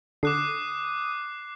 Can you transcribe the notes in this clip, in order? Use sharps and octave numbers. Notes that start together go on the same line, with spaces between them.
D3 D6 D#6 F#6 C7